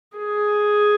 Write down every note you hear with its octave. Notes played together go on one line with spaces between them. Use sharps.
G#4